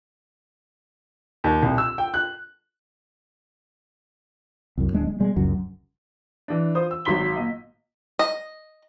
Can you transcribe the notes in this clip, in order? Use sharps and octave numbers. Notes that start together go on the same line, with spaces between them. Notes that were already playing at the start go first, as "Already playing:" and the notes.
D#2
C2
E6
G5
F#6
C2 F#2
D1 G#3 D4
G#3
B2 G3 G#3
F#1 C#2 F#2 F#3
E3 D4
F4 C5 D#6
E6
G#1 F#3 D#4 C6 B6 G7
A#2 D#5
D#5